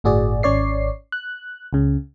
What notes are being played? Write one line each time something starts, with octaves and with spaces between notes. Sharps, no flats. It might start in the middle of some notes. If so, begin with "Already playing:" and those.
G1 A2 F#4 G#4 D5
G#1 C#4 C#5 D5 C7
F#6
C#2 C#3